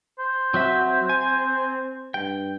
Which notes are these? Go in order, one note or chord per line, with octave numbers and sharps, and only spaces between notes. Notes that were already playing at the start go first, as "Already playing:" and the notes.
C5
F#3 C4 F#4 E5
G#5
G2 G5